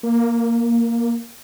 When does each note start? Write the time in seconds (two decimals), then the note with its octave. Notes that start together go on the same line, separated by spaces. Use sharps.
0.03 A#3